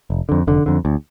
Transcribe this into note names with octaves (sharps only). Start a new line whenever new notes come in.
F1
F2 D3
F1 D3
F2 D3
D2